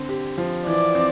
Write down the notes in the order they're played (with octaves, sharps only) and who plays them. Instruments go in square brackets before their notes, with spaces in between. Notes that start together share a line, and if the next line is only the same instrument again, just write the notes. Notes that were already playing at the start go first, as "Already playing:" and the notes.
Already playing: [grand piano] D3 C4
G4
F3
[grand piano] E3 [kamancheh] D5
[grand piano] C4